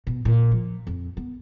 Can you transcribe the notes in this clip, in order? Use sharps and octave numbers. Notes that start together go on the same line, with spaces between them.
B2
A#2
F3
F2
B3